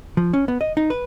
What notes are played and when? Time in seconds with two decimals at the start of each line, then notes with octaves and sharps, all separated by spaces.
0.17 F3
0.33 C#4
0.48 B3
0.61 D#5
0.77 D#4
0.90 B4